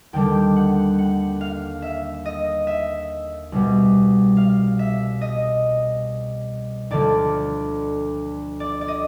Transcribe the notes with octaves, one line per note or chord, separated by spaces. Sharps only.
D#2 D3 G3 G5
F#5
F#5
F5
E5
D#5
E5
C2 B2 G3
F5
E5
D#5
D2 D3 F3 A3 D5
D5
D5
D#5